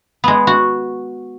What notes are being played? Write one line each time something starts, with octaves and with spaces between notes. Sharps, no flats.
G#3 B3
F#4